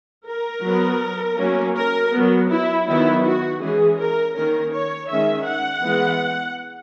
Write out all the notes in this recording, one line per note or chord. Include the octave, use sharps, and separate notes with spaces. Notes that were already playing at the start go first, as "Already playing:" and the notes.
A#4
F#3 B3
F#3 A#3 C#4
A#4
F#3 B3
E4
D#3 F#3 B3 E4
F#4
E3 G#3 C#4 G#4
A#4
D#3 A#3 C#4 A#4
C#5
D#3 G#3 C#4 E5
F#5
E3 G#3 B3